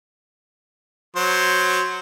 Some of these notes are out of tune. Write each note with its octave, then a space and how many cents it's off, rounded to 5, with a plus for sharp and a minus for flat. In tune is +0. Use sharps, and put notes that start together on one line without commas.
F#3 -5 C5 +0